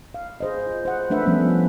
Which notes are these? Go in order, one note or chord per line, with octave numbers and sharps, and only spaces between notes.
F5
G#4 C5 D#5
F4
C5 F#5
A3 D4 B4 E5 F#5
F3 G3 A3 B3 C#4 D4